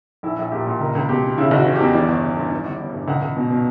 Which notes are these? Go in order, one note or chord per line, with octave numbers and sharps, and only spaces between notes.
A#1 E4
A#1
A#2 G4
A#2
C#2 A#4
C#2
B2 G4
B2
C#3 E4
F#1 F#4
E3
E2 G4
E3 D5
G1
G1
G2
E3
G1
G1
G2
C#2 F#5
C#2
B2
B2